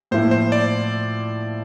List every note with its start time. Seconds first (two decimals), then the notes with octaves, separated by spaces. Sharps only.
0.11 A2 F3 A#3 E4 C5
0.31 C5
0.52 D5